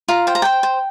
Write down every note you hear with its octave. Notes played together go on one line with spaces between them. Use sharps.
F4 A#5
C5 G5
A#5
C5 G5
C5